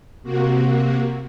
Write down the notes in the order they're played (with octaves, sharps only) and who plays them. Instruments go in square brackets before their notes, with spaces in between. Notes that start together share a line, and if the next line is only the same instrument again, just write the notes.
[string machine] C3 A#3 F#4